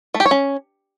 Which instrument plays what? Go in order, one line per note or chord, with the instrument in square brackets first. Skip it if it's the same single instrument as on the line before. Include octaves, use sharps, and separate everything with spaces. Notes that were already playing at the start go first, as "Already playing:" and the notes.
[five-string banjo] A3
G4
C#5
C#4